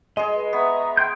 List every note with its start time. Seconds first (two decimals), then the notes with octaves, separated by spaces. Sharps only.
0.17 G#3 G#4 D#5
0.33 B4
0.53 B3 E5 A#5 C#6
0.97 G5 C6 G6